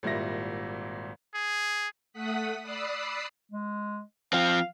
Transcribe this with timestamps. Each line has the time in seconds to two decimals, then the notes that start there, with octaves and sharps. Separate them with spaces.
0.03 G#1 A#2 G3 E4 A#6
1.34 G#4
2.13 A3 F#5 D#6 F#6 B6
2.63 D5 B5 D#6 E6 F#6 C7
3.52 G#3
4.33 F3 C4 F5